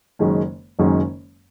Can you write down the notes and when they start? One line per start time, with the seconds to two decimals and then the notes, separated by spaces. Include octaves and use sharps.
0.19 F#1 F#2 D#3 G#3 C#4
0.79 F#1 F#2 D#3 G#3 C#4